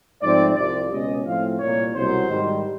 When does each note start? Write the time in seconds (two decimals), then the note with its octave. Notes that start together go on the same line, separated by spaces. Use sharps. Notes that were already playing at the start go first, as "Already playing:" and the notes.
0.21 G#2 F3 A3 C4 D5
0.55 C2 C3 F3 D5
0.90 C#2 B2 G#3 C#4 D#5
1.24 A2 F3 A3 C4 F5
1.58 C2 A#2 G3 A#3 C#5
1.93 C2 B2 F#3 C5
2.27 G#2 D#3 G3